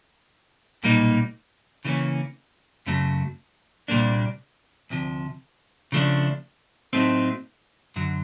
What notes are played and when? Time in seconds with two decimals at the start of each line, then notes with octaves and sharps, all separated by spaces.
0.83 B1 A#2 G3 A#3 D#4
1.85 C#3 E3 G3 A#3 C#4
2.86 F#2 C#3 F#3 A3
3.88 C2 A#2 G3 A#3 D4
4.90 D2 C3 F3
5.92 C#3 F3 A3 D4
6.93 A2 F#3 A3 C4 D#4
7.96 F#2 D3 F#3